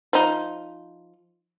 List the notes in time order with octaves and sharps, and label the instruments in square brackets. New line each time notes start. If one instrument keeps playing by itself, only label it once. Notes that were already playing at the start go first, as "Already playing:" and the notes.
[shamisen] F3 D#4